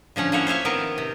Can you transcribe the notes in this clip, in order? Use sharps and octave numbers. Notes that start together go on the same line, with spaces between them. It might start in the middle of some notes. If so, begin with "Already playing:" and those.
D3 F3 C#4 F#5
F3 A#3 E4 C#5 F#5
C5 C#5 E5 F5
D#3 B3 C4 A#4
C3